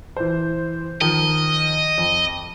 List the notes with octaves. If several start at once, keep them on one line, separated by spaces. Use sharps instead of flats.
E3 C5
D#3 F3 D#5
F2